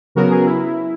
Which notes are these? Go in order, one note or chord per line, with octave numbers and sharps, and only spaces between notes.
C#3 F#3 B3 F#4 A#4
G#4
E4